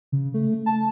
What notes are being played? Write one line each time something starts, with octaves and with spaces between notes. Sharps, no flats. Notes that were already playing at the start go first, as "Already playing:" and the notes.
C#3
A3
A5